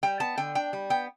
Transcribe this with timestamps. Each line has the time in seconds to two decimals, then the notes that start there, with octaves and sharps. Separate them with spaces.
0.03 G3 G5
0.20 B3 A5
0.38 D3 G5
0.55 D4 G5
0.73 G3
0.90 B3 G5